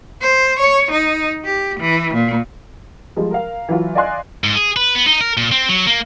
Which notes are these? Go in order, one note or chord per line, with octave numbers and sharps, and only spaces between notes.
C5
C#5
D#4
G4
E3
A#2
F3 G3 G#3
A#4 F5
E3 F#3 F4
D5 D#5 F5 G#5 C6 F#6
G#2
G#4
B4
B3
D#4
A#4
A#2
C4
F#3
A#3